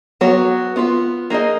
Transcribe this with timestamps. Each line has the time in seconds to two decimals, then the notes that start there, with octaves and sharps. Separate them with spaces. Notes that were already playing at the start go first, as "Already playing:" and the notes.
0.21 F#3 B3 F#4 C#5
0.76 B3 F4 B4
1.30 A#3 D#4 G#4 D#5